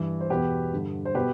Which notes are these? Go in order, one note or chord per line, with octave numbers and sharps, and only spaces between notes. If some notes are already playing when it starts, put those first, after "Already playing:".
Already playing: G2 E3
C5
E2 B2 G4 B4
G2 D3
C5
B2 G4 B4